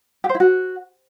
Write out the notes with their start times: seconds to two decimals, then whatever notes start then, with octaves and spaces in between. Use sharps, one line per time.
0.24 G4
0.29 C5
0.35 E4
0.40 F#4